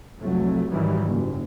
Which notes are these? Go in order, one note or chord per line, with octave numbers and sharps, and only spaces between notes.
F1 C2 F#3 A3
G#2 D#3 E3 F#3 G3
F#1